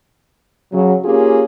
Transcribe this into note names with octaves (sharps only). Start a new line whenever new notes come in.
C#3 F#3
A#3 C#4 F4 G4 G#4